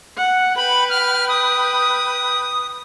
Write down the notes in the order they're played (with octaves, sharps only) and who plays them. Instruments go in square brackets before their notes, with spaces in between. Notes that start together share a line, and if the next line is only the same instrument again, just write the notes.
[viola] F#5
[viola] B4 G5 [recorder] B5
[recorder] F6
D#6